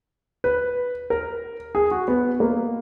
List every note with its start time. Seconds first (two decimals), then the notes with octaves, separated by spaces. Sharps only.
0.44 B4
1.10 A#4
1.75 G#4
1.91 F#4
2.08 B3
2.40 A#3